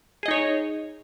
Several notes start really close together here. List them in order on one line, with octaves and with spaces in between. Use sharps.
G#4 D#5 D#4 C#5